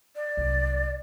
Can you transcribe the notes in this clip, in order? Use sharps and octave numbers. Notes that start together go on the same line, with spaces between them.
D5
C2 F#3